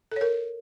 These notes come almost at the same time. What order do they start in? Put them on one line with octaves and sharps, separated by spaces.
A4 C#5 A#4